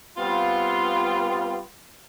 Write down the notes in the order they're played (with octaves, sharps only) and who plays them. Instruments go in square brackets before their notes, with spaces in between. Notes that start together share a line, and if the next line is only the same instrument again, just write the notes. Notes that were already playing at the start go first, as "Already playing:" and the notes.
[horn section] G3 B3 C4 F4